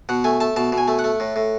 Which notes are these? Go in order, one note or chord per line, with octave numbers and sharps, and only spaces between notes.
B2 F#5
A3 G#5
A3 A5
B2 A5
B2
G#5
A3
F#5
A3
A2
A2